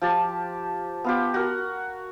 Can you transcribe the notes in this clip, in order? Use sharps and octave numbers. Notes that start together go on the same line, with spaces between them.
F3 G4 A5
B3 F4 G4
F#4 A#4